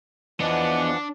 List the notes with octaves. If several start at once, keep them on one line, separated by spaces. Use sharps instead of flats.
E2 E3 F3 B3 D4 D#5 F#5